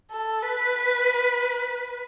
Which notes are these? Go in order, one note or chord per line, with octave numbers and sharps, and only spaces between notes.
A4
B4